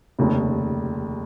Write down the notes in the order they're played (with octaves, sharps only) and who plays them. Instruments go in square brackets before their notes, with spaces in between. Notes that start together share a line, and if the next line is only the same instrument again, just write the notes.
[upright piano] F1 D#2 C#3